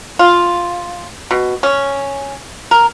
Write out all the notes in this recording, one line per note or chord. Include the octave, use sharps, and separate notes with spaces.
F4
B2
C#4
A#4